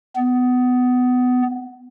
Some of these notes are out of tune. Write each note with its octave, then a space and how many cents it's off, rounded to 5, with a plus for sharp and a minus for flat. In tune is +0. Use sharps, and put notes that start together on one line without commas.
B3 +20